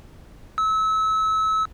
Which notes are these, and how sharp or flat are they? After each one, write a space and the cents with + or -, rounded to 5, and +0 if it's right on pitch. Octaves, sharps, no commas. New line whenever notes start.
E6 -30